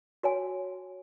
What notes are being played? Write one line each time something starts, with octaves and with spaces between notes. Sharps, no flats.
F#4 C#5 G#5